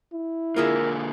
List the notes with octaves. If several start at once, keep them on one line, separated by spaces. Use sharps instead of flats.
E4
D3 A#3 F4 G#4 A#4 E5